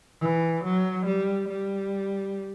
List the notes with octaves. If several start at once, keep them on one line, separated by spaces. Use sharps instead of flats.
E3
F#3
G3
G3